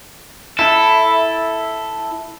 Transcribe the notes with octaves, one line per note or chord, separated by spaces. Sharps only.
E4 A4